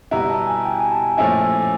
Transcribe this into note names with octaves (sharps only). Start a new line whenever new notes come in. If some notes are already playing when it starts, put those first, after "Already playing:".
B2 G3 B3 E4 A#5
A5
G#5
G5
G#5
A5
A#2 F3 A3 C#4 E4 G#5